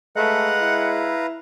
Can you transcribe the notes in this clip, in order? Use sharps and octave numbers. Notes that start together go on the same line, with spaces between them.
G#3 A3 B4 F5 F#5 A#5
E4